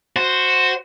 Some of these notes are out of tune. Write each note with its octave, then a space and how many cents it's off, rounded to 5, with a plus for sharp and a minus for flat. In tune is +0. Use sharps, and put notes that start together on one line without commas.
F#4 -5 C5 +0